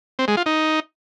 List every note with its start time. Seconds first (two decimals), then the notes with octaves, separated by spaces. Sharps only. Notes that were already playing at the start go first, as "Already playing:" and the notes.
0.19 C4
0.28 G#3
0.37 F4
0.46 D#4